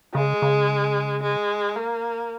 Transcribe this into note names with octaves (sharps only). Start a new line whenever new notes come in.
C#3 G#3
C#3
G#3
A#3